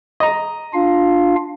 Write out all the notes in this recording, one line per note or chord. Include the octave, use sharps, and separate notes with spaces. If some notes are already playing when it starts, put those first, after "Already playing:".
D#5 A#5
D4 F4 F5